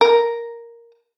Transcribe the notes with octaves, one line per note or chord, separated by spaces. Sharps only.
A#4